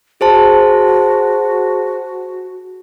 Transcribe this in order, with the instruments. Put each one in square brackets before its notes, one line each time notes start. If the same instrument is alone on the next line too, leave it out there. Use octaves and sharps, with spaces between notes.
[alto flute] F#4 [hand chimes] G#4 C5 A5